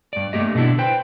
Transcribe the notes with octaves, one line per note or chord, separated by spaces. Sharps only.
G2 D5
G2 A3 A#3 G4 D#5
B2 D3 D4 E4
B4 C5 G5